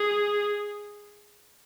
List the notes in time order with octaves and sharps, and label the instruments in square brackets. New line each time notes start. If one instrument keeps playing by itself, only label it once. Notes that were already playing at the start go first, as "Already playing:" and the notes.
Already playing: [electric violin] G#4